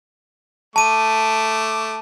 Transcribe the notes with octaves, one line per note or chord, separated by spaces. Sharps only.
A3 A5 D6 D#7